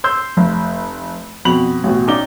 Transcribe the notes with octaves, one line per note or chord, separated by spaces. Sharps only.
C6 E6 G6
F1
F2 B2 B5 F7 F#7
A1 B2
C#4 D#4 D5 D6 G7